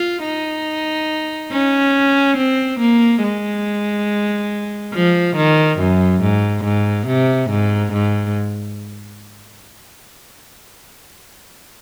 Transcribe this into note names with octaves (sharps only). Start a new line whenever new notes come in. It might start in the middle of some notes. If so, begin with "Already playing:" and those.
Already playing: F4
D#4
C#4
C4
A#3
G#3
F3
D#3
F#2
G#2
G#2
C3
G#2
G#2